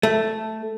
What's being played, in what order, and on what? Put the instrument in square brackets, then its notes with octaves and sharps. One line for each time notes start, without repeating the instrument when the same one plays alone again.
[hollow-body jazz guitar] A3